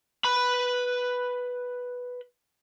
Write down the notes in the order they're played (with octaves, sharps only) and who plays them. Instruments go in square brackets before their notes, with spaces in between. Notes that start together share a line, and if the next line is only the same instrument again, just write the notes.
[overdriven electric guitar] B4 B5